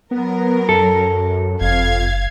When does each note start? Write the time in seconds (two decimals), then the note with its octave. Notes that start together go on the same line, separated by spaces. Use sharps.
0.11 F#3 B3 A#4
0.69 F#2 A4
1.61 F#1 F2 F5 G#6